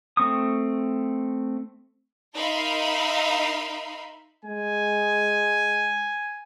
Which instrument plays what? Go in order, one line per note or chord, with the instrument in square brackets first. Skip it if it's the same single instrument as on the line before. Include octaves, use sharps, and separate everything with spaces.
[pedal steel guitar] A3 C4 C#6 D#6
[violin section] D#4 A#4 E5 F5 B5 C6
[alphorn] G#3 [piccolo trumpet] G#5